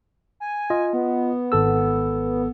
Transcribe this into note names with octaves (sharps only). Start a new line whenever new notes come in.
G#5
F4 D#5
B3
G#1 A4 E6